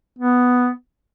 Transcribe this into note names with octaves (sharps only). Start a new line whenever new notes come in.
B3